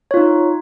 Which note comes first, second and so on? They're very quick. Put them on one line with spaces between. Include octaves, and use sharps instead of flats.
C#5 F4 D#4